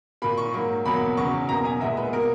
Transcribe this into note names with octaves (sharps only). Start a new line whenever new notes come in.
A#2 A#3 B5
C#6
G#2 F#3 A#3
E2 B2 F#3 A#3 B5
E2 C#3 F#3 B3 C#6
E2 B2 A#3 A#5
G#5
A#2 G#3 B3 E5
B4
B2 A#3 A#4